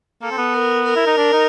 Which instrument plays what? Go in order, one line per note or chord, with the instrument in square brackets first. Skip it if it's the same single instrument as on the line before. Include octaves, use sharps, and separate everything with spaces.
[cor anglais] A#3 [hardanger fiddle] A4
[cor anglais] C4
B3
[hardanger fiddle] A#4
A#4
[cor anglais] E4
D#4
D4
D#4